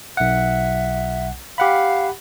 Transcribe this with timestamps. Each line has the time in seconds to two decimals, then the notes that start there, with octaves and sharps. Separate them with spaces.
0.17 B1 E5 F#5
1.58 G4 F5 F#5 B5